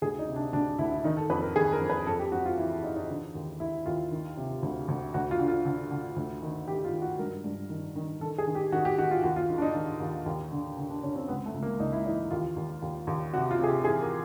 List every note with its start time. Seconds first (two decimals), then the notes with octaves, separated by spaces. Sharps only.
0.02 D2 G#4
0.19 D#4
0.28 C3
0.36 D4
0.53 D2 D4
0.79 D2 E4
0.92 E4
1.04 D#3 D#4
1.17 A4
1.30 F2 B4
1.42 A#4
1.56 D#3 G#4
1.73 A#4
1.81 F2
1.90 B4
2.07 F2 A4
2.19 G4
2.32 F2 F#4
2.45 F4
2.58 E3 E4
2.83 E3 D#4
2.96 D#4
3.09 D3
3.35 D#2
3.60 D#2 E4
3.86 D#2 F4
4.12 D#3
4.37 C3
4.63 D2
4.88 D2
5.14 D2 F#4
5.31 F4
5.39 D3
5.48 F4
5.65 D3
5.91 D3
6.16 D2
6.42 D#3
6.68 D#3 G4
6.85 F4
6.93 D#3
7.02 F#4
7.19 G2 A#4
7.44 G2
7.70 D#3
7.96 D#3
8.21 D#3 A4
8.38 G#4
8.47 D#3
8.55 G4
8.72 D#3 F#4
8.85 G4
8.98 D#3 F#4
9.11 F4
9.23 D#2 F#4
9.36 F4
9.49 D#3
9.58 D4
9.62 D#4
9.75 D#3
10.00 D#2
10.26 D#2
10.51 D3
10.77 D3
10.90 D4
11.03 D3 C#4
11.16 C4
11.28 C#2 B3
11.46 A3
11.54 C#2
11.63 A#3
11.80 C#2 D#4
11.92 E4
12.05 E3 D#4
12.31 D#2 F4
12.56 D#2
12.82 D#2
13.07 D#2
13.33 C3 F#4
13.51 F4
13.59 C3 G#4
13.68 G4
13.85 E3 G#4
14.02 A#4